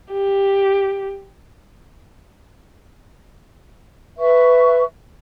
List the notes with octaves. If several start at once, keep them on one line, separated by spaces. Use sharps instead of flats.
G4
B4 E5 C#6